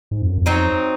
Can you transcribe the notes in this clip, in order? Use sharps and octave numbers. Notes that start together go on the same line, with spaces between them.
G#2
F2
F#2
F2
F#3 C4 D#4